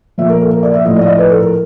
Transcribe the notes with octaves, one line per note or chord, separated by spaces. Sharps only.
A#2 F3 E5
A#4
A4
A#4
D5
E5
A2 F3 D#5
D5
D#5
D5
B4
A4
A#4